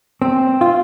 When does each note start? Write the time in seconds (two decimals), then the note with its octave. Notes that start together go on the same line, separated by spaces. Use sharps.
0.22 C4
0.61 F4